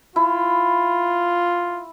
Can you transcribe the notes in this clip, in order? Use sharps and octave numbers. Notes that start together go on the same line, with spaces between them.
E4 F4